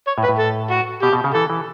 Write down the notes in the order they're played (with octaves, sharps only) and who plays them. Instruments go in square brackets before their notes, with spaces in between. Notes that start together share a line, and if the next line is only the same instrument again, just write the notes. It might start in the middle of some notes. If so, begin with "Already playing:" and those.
[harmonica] C#5
[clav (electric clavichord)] A2
[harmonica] B4
[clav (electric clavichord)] A2
[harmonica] A4
F#4
[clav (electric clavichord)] B2 [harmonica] G4
[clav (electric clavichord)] B2
C#3
[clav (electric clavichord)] E3 [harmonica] A4
[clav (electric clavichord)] E3